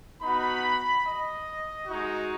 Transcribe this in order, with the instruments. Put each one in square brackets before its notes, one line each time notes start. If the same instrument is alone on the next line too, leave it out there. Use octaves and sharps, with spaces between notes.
[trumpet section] B3 D#4 F#4 B5
D#5
G#3 D#4 F#4